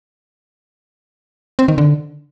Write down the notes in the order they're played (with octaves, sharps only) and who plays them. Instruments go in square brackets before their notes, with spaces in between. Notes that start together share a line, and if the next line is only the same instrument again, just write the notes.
[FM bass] C4
D#3
D3